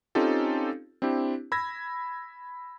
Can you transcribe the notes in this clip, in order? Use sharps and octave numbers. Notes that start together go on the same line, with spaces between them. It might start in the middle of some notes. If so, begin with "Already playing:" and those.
C4 C#4 D#4 F4 G4 A4
C4 D4 E4 G4
B5 E6 G#6 A#6